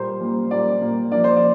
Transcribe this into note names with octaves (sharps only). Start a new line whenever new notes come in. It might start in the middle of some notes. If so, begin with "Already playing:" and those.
Already playing: A#2 G3 A#3 C5
A#2 G3 A#3
A#2 G3 A#3 D5
A#2 G3 A#3
F3 A#3 D4 D5
C5
D5